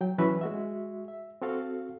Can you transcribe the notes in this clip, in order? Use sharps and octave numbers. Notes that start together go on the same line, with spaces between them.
F#3 G5
E3 F#3 C#4 B4 E5
G#3 F#4 E5
E5
C4 F#4 A4 F5